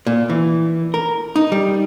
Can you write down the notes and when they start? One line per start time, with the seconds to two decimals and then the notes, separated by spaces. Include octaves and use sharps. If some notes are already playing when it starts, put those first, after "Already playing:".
0.07 A#2
0.30 E3
0.94 A#4
1.36 D#4
1.52 G3